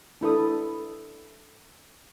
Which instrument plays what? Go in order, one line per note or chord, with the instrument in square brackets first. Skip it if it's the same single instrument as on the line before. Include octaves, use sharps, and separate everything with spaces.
[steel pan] D4 E4 A4 D#6